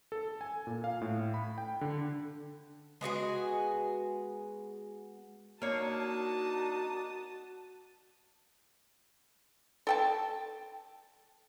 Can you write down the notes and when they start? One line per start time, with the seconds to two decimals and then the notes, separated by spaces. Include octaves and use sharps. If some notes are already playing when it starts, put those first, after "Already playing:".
0.12 A4
0.41 G#5
0.67 A#2
0.84 F5
1.01 A2
1.34 B5
1.58 G5
1.81 D3
3.01 G#3 B3 F#4 G#4
5.62 A#3 D4 D#4 F#4 C#5 A5 D#6
9.87 A4 G5 A5